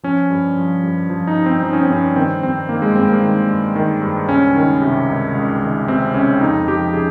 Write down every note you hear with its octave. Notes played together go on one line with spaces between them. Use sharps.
F3 C#4
G2
F3
G2
F3
D#4
G2
C4
F3 D#4
C#4
C4
G2 C#4
D#3 C4
G2 C4
D#3 A#3
G#3
G2 C4
A#3
D#3
G2
D#3
G2
C#2 C#4
D#3
C3
C#2
C#2
D#3
C3 C4
C#2 C#4
F2 D#4
F3 G4
C#3 G#4